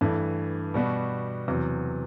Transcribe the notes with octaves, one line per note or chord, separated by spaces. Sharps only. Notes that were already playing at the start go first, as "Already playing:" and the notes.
G2 E3 A3
B2 G3 B3 F#4
E2 C3 F#3